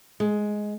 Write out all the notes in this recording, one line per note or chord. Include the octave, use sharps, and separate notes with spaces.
G#3